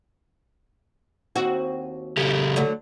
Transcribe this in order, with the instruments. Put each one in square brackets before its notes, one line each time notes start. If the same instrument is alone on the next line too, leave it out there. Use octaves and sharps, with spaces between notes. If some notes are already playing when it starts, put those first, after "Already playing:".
[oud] D#2 C4 F#4
[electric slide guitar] C#3 G4 A4
[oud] D3 F#3 A3